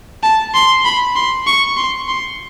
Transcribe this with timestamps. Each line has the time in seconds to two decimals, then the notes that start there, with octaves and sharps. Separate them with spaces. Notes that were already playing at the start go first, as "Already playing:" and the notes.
0.23 A5
0.54 C6
0.85 B5
1.16 C6
1.47 C#6
1.77 C6
2.08 C6